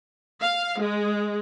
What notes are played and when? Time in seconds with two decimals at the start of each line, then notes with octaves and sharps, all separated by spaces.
0.41 F5
0.81 G#3